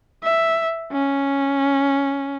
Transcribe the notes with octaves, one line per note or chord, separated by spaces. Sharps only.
E5
C#4